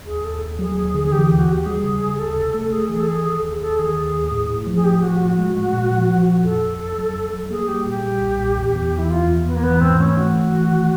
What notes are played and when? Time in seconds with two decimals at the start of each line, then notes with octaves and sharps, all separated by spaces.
0.06 D#2 G#4
0.24 D#2 A4
0.42 D#2
0.59 F#3 G#4
0.77 D#2
0.94 D3
1.04 G#4
1.12 E3 G4
1.26 D#2 G4
1.39 F#4
1.48 D#2 G4
1.66 G3 G#4
1.83 C#3
2.01 D#2
2.13 G#4
2.19 D2 A4
2.37 C3
2.54 A3
2.60 A4
2.72 A3 G#4
2.89 E3 G#4
3.00 A4
3.08 E3 G#4
3.25 D#3 A4
3.43 D#2 G#4
3.61 D#2 A4
3.79 D#3 G#4
3.96 D#2
4.14 D#2
4.31 A2
4.49 A2
4.67 F3
4.75 G#4
4.84 A2 G4
5.03 F3 F#4
5.20 A2 F#4
5.38 G#3
5.56 G#3
5.73 A#2
5.91 F3
6.09 F3
6.27 A#2
6.44 F2 A4
6.62 F2
6.80 F2
6.98 F#3
7.16 F2
7.33 F#3
7.51 A#3 G#4
7.68 G3 G4
7.86 A#2 G4
8.04 G3
8.21 B1
8.39 A#2
8.57 E2
8.75 E2
8.92 E3
8.98 E4
9.10 E2 F4
9.27 E2
9.46 E2 B3
9.55 A#3
9.63 E3 B3
9.81 G#2 C4
9.99 A3 C#4
10.17 E3 F#4
10.34 A3
10.53 E3
10.69 D#3